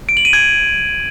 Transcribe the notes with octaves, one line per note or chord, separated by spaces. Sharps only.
D7
F#7
D#7
G#6